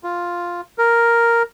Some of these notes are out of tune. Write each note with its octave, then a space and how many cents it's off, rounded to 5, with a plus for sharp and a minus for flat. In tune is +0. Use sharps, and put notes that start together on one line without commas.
F4 +0
A#4 +0